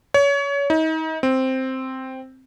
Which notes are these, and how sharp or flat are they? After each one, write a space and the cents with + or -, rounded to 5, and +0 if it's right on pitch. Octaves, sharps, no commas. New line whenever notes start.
C#5 +30
D#4 +35
C4 +0